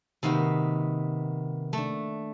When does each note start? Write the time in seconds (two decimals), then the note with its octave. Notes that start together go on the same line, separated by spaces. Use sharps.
0.23 C3 D#3 A#3 B3 F#4
1.73 A3 D4